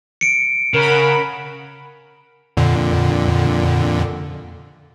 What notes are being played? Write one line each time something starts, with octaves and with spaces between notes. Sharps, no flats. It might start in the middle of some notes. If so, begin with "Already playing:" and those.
C#7 D7
C#3 A#4 F#5 B5
F2 A#2 D3